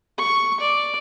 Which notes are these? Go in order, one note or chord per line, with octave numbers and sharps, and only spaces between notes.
C#6
D5